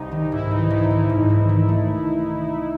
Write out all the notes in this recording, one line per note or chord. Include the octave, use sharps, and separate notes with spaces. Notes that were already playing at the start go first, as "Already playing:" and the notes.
Already playing: C2 C3 D#4
D#3
G#2 E4
E3 D#4
G#1 E4
G#1 D#4
G#2
E3
D#3
A3